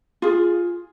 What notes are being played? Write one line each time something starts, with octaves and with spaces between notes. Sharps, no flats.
F4 G#4